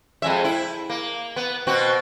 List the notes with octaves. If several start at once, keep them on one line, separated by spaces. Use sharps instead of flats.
F2 G#3 E5
E4
A#3
B3
B2 C4 F#4